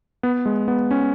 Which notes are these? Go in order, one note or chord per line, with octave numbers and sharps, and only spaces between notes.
B3
G#3
B3
C#4